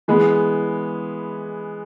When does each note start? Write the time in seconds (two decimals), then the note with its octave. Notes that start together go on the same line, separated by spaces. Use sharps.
0.08 E3 G#3 B3